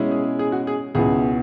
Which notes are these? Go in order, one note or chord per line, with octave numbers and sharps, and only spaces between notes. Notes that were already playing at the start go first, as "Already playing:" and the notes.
Already playing: B2 G#3 C#4 E4
G#4
G#4
F#4
G#4
C#2 B2 B3 E4 G#4